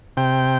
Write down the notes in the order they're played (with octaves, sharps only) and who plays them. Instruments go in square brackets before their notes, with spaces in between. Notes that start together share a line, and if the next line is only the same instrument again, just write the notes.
[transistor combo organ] C3 G5